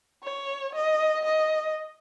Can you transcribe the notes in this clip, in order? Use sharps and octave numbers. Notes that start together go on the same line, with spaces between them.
C#5
D#5
D#5